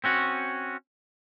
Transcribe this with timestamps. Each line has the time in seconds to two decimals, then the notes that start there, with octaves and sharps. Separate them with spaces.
0.04 C4 C#4 F#4